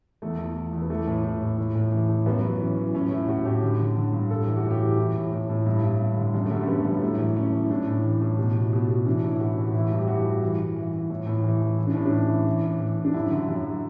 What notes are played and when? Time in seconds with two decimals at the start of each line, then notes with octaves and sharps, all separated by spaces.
0.22 E2 A3
0.39 E2
0.56 E2
0.73 E2
0.82 B3
0.90 E3 A3
1.07 A2
1.24 A2
1.41 A2
1.58 A2
1.75 A2
1.92 E3
2.09 A2
2.26 F#2 B3
2.43 F#2
2.60 E3 C#4
2.77 E3
2.94 A2 C#4
3.10 A2 E4
3.28 A2 F#4
3.45 A2 G4
3.63 D3
3.78 D3
3.96 D3
4.13 G2
4.30 A2 A4
4.44 E3 G4
4.57 F#4
4.64 A2
4.71 G4
4.81 E3
4.98 E3
5.16 A2
5.32 A2
5.49 A2
5.66 G2 E4
5.83 G2
6.00 G2
6.17 D3
6.34 F#2
6.45 A3
6.51 D3 G3
6.63 C#4
6.68 F#2 B3
6.85 F#2 G3
7.02 A2 A3
7.19 E3
7.36 E3 C#4
7.52 A2
7.64 E4
7.70 A2 D4
7.88 A2
8.04 E3
8.21 A2
8.38 B2
8.55 B2
8.73 B2
8.89 B2
9.06 E3 D4
9.24 A2
9.29 E4
9.40 E3 F#4
9.58 A2
9.67 F#4
9.74 E3 E4
9.92 G2
9.99 G4
10.08 E3 F#4
10.25 E3
10.42 E3
10.59 E3
10.76 E3
10.93 E3
11.10 A2
11.27 A2
11.44 E3
11.61 E3
11.78 E3 E4
11.87 D4
11.95 A2 C#4
12.05 D4
12.12 E3
12.29 E3
12.46 E3
12.63 A2
12.80 E3
12.97 A2
13.05 D4
13.14 F#2 E4
13.31 D3
13.49 F#2